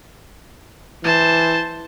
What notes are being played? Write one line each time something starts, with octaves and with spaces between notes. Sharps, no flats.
E3 C5 A5